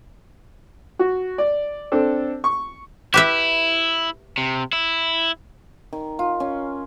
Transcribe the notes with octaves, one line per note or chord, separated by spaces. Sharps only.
F#4
D5
C4 D4 A4
C#6
E4 G4 B4 E5
C3
E4
D#3
F4
C#4